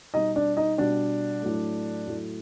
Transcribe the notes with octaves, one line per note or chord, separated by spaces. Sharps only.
B2 G3 D#4 D#5
D4 D5
D#4 D#5
B2 G3 D4 D5
A2 F#3 A3
A2 F#3 A3